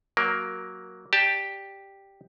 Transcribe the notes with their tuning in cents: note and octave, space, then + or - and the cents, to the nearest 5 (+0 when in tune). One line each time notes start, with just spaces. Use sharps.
F#3 +0 A#3 +0 A#4 +10
G4 +0 D5 +0 A5 +0